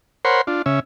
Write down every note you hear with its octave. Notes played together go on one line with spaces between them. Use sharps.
A#4 C5 C#5 F#5 B5 C6
D4 F4
C#3 C#4 E5